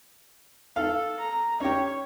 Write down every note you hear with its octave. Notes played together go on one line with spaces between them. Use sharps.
A4 F5
A#5
C#4 G4 C#5